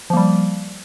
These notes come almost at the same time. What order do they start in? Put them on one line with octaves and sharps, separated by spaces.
F3 A#3 G3